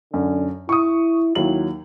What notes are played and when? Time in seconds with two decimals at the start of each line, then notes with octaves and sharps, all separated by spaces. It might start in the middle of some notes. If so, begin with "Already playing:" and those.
0.14 F#2 D3
0.69 E4 C#6 D#6
1.35 D#2 F#3 E4 F#7